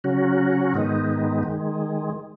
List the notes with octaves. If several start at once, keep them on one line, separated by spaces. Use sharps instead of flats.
C#3 F#3 C#4 F#4
G#2 D#3 G#3 B3 D#4
D#3 G#3